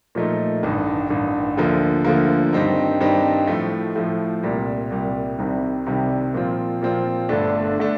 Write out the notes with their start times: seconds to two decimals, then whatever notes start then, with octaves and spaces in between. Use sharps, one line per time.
0.15 A#2 F3 A3 D#4
0.63 A1 G2 D#3
1.10 A1 G2 D#3
1.57 D2 D3 F3 A#3
2.05 D2 D3 F3 A#3
2.53 G2 D#3 G3 C4 D#4
3.00 G2 D#3 G3 C4 D#4
3.47 A2 F3 A3
3.96 A2 F3 A3
4.43 C2 A#2 G3
4.90 C2 A#2 G3
5.38 C2 C3 D#3 G3
5.86 C2 C3 D#3 G3
6.34 A#2 F3 C4 F4
6.81 A#2 F3 C4 F4
7.29 G1 G2 D3 A3 D4
7.79 D3 A3 D4